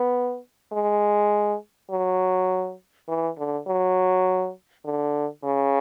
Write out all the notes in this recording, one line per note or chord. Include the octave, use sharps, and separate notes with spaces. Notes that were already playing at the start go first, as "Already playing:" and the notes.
Already playing: B3
G#3
F#3
E3
D3
F#3
D3
C#3